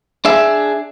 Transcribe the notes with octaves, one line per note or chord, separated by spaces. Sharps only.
D4 G#4 E5